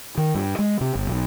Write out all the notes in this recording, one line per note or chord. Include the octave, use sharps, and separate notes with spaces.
D#3
G2
G#3
C3
G1
B1